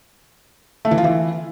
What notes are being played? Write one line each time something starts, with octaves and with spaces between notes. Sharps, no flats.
A3
E3
F4
E3